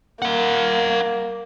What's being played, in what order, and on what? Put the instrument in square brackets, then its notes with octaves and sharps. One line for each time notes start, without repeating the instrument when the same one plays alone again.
[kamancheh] A#3 [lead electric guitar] A#4 F#5